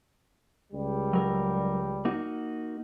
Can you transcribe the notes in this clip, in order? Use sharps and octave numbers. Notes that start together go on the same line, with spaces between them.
C#2 G3
F#3 A#4
A#3 D#4 F#4